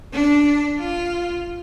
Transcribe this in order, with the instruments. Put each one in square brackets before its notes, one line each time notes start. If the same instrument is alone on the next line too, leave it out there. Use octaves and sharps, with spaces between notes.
[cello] D4
F4